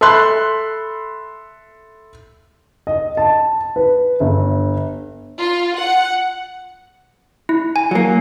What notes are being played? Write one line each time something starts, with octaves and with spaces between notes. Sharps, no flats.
A4 E5 B5 C6 F#6
D#5
A5
B4
G1
F4
F#5
E4
G#5
F#3 A#3